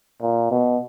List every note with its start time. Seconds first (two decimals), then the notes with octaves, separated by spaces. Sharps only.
0.22 A#2
0.51 B2